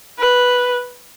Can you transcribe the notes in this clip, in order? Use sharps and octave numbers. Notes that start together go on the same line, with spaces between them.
B4